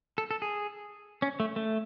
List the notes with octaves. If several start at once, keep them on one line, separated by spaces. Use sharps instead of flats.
A4
A4
G#4
C#4
A3
A3